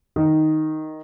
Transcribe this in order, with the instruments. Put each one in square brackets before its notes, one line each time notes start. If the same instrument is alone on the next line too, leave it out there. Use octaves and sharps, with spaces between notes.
[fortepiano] D#3